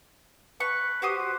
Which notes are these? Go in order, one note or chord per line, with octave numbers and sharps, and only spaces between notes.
B4 C#6
F#4 G4 C5 D#6